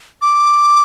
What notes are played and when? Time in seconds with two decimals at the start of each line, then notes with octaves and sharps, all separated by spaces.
0.22 D6